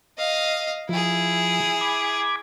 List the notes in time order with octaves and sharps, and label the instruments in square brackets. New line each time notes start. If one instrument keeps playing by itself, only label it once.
[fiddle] D#5 F5
[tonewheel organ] F3 [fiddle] E4 G#4
[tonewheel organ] B5 D6 G#6